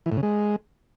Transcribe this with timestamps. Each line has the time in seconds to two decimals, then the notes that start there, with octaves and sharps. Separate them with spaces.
0.06 E3
0.12 A2
0.17 C#3
0.23 G#3